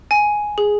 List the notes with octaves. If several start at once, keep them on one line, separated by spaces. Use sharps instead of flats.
G#5
G#4